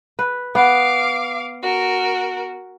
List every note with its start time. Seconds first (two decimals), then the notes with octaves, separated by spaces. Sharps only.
0.19 B4
0.55 B3 F5 D6
1.62 F#4 A#4